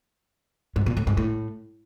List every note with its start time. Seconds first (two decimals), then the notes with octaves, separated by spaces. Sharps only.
0.76 G#2
0.86 A#2
0.97 A2
1.07 G#2
1.17 A2